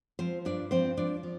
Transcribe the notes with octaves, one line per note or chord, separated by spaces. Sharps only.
F3 C4 C5
G2 D4 D5
F3 C4 C5
F3 D4 D5
F3